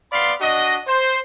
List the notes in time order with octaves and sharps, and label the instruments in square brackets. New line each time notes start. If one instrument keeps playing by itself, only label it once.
[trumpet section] B3 D5 F5 B5 C6
D4 F#4 D#5
C5